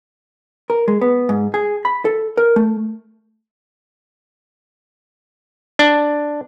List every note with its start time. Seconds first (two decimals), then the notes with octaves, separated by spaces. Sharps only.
0.70 A#4
0.88 G#3
1.01 B3
1.29 G#2
1.54 G#4
1.85 B5
2.05 A4
2.37 A#4
2.56 A3
5.79 D4